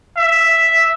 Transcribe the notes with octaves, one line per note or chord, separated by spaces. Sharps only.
E5